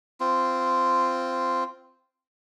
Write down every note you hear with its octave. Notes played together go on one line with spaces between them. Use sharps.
C4 F4